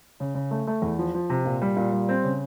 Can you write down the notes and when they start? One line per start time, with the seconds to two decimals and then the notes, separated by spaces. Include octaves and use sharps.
0.20 C#3
0.35 C#3
0.51 A3
0.67 A3
0.82 E2
0.99 F3
1.14 F3
1.30 C3
1.45 A#2
1.62 G3
1.76 A#2
1.92 G3
2.09 C4
2.24 C#3